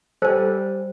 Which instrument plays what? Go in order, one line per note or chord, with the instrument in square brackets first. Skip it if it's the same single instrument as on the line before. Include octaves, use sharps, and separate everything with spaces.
[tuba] G3 [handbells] A4 G#5 [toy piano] C5